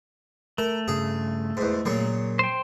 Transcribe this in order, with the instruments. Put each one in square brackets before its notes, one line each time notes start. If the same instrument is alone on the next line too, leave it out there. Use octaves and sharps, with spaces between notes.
[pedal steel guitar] A3 [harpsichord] A#4
[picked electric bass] G2 C#3 [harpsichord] G#4
[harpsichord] E2 G#2
[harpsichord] A#2 C#3 A#3 [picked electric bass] F#3
[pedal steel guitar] C5 G5